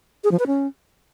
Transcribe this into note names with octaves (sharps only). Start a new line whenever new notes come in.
G#4
F3
B4
C#4